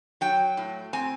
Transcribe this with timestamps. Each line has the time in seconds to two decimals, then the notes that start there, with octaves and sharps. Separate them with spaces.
0.21 F#3 G5
0.57 A2
0.93 C4 G#5